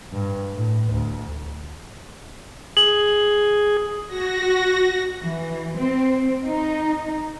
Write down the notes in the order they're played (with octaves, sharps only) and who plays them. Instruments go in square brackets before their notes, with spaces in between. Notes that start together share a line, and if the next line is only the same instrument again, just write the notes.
[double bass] G2
A2
D2
[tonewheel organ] G#4 [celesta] F#7
[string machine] F#4 A#6
[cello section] E3
C4
D#4